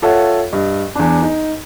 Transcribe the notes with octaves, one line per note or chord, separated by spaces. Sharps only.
F4 A4 C#5 E5 F#5
G2 D#5
E2 D4
D#4